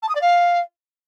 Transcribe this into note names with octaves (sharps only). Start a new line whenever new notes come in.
A5
D#6
D5
F5